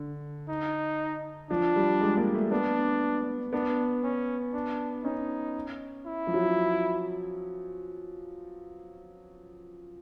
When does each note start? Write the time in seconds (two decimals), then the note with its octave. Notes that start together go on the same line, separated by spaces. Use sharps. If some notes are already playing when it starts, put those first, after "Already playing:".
Already playing: D3
0.49 D#4
1.50 F3 D4
1.76 G3
2.01 G#3
2.17 A#3
2.35 A3
2.51 B3 D4
3.53 B3 D4
4.04 C#4
4.53 D4
5.04 C#4 D#4
6.06 E4
6.27 F3
6.34 F#3